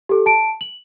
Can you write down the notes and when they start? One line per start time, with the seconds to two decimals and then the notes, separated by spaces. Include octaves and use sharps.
0.09 G4 A4
0.26 A5 D7
0.61 F#7